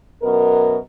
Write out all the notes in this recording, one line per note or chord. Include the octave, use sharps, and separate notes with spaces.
F#2 B2 A#4